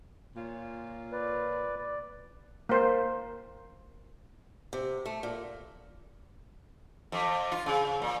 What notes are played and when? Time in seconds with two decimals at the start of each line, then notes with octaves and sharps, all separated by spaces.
0.35 A#2 F4 C#5
1.12 B4 D5
1.78 D5
2.69 A#3 C5
4.73 C3
5.06 A3
5.23 A#2
7.12 F2
7.52 F4
7.66 C#3
8.02 A#2